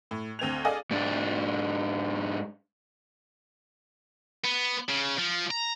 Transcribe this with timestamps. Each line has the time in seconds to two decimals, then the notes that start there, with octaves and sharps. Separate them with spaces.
0.11 A2
0.39 D2 C4 G#6 F7
0.65 G#4 A4 D5 D#5 F5 G#5
0.91 G#2 D4
4.44 B3
4.89 C#3
5.19 F3
5.51 A#5